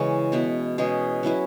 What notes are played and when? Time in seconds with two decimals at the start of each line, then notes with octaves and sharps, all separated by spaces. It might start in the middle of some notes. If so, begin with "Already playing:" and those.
Already playing: C#3 E3 G#3 C#4 F#4
0.32 B2 B3 E4 B4
0.78 B2 G#3 C#4 G#4
1.23 F#3 C#4 E4 B4